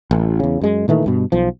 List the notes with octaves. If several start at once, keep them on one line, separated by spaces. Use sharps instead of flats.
A1
E2 C#3
F#2 G#3
A#2 D#3 E3 A3
G2 B2
B1 F3